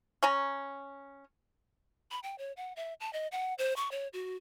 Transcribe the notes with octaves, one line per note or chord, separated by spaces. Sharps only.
C#4 G#5 A#5
B5
G5
C#5
F#5
E5
A5
D#5
F#5
C5
C#6
C#5
F#4